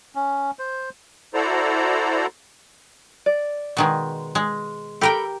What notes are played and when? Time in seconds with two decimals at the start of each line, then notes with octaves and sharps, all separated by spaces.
0.15 C#4
0.59 C5
1.34 E4 F#4 A4 C5 D5 A#5
3.26 D5
3.77 B2 D#3 G#3
4.35 G#3
5.01 G4 A4 A#4 G5 B5